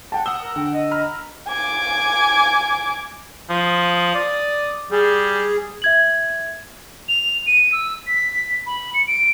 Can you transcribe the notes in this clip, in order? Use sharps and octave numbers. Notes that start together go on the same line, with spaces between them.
F#5 G5 A5
F#5 D#6 E6 G7
A#4
D3 G5
D#5
A#5 B5 F6
G#5 D6
F3 D#6
D5
G3 G#4
E5 G#6 F#7
F7
D#7
E6
B6
B5
C#7
D7